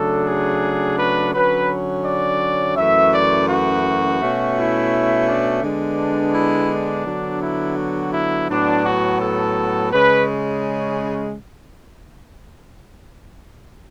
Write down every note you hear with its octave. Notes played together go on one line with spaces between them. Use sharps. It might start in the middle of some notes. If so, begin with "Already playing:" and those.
Already playing: C#3 F#3 A3 D4 A4
G#4
B4
D3 F#3 C#4 B4
D5
F#2 E3 A3 E5
D5
F#4
B2 A3 C#4
E4
D4
D3 G#3 B3 D4
E4
D4
D3 F#3 B3
E4
F#4
E4
A2 F#3 B3 D4
F#4
A4
C#3 G#3 C#4 B4